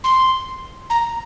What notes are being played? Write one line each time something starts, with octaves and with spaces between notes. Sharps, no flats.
C6
A#5